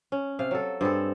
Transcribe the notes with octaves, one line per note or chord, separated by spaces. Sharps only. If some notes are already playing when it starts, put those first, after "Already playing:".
C#4
C3 F5
F#3 A4
G2 C4 G#4 A4